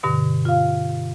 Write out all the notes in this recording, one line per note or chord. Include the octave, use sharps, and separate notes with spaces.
G2 B2 D3
F4 F5